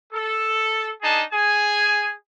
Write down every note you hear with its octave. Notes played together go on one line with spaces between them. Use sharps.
A4
D4 D#4 G#4 A5
G#4 G#5